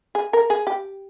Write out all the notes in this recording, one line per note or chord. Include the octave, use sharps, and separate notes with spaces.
G#4
A#4
G#4
G4